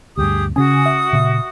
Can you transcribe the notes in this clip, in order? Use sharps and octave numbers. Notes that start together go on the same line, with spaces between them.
D2 G2 G4 G#4 D#6
C#3 C#4 F#4 G#5 D#6
E5
A#2 C#3